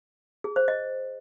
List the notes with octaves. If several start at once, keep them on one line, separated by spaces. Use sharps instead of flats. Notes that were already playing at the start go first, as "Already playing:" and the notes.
G#4
C5
D#5